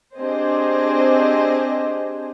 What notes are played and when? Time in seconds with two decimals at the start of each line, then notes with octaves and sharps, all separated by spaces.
0.18 C4 D4 G4 G#4 C5 D#5